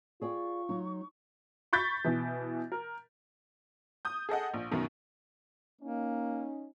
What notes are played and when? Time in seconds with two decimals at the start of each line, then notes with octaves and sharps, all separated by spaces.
0.22 F4 G#4 D5 G5 C#6
0.69 F#3 D#4
1.73 B5 C#6 G6 A6 B6
2.04 B2 E3
2.72 A#4
4.05 D#6 G6
4.29 G#4 A4 D#5 F#5
4.54 A#1
4.71 F#2 B2 D#3
5.81 A#3 C#4 D#4